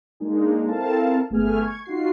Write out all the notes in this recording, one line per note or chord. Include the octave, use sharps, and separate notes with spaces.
G#3 A#3 D4 D#4 G#4
C4 E4 A4 A#4 F5 A5
G1 A3 B3 G#4 G#5 F6
C#6 G#6
D#4 F4 F#4 C7